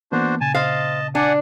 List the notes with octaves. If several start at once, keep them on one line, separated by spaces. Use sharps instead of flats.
E3 A#3 B3 D4 F#4 C5
A#2 C#3 G#5 A5
C5 D#5 F5 A5
D4 D5 F#5 G#5